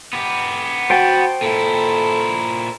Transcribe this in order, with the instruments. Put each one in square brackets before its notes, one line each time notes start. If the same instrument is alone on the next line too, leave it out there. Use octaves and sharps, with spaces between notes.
[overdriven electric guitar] B3 G4
[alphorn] F#4 [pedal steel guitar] C5 G5 A5
[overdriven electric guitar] A#2 E4 [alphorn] A4